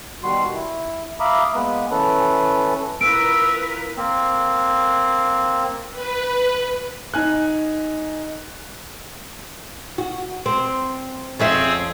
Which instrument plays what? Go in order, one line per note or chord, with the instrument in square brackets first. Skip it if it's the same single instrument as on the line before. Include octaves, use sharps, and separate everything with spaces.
[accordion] B2 D#3 G3 F#4 C6
E4
E5 F5 A#5 B5 D6 D#6
G#3 A#3 B3 B4
E3 C#4 A4 B4
[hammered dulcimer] E3 E4 F4 [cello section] A#4 B4 [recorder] E6 [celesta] D7
[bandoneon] A#3 C4
[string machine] B4
[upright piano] D#4 G#5 F#6
[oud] F#4
C4
[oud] F2 C#4 E5 [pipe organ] C4 G#4